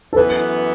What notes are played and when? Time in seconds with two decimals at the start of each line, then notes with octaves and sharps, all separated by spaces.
0.13 A4
0.16 F#2 E3 B3 B4